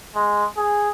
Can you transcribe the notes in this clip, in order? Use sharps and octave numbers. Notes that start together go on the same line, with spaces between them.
G#3
G#4